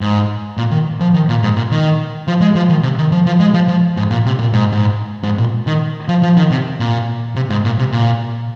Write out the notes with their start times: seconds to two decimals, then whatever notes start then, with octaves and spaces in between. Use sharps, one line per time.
0.01 G#2
0.57 A#2
0.71 D#3
1.00 F3
1.14 D#3
1.29 A#2
1.43 G#2
1.57 A#2
1.71 D#3
2.28 F3
2.41 G#3
2.56 F3
2.69 D#3
2.83 C3
2.98 D#3
3.12 F3
3.26 F3
3.40 G#3
3.54 F3
3.68 F3
3.97 G#2
4.11 A#2
4.26 C3
4.39 A#2
4.53 G#2
4.72 G#2
5.23 G#2
5.38 A#2
5.67 D#3
6.08 F3
6.23 F3
6.37 D#3
6.51 C3
6.80 A#2
7.36 C3
7.50 G#2
7.65 A#2
7.79 C3
7.92 A#2